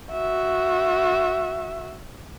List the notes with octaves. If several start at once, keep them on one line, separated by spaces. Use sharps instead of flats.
F#4 E5